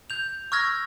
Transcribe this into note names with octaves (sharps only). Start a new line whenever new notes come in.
G6 F7
C#6 E6 F6 G#6 A#6